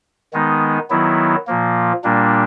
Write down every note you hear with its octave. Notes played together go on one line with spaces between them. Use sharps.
D#3 G#3 B3 D#4
D#3 F#3 B3 E4
A#2 F3 A#3
A#2 G3 A#3 D4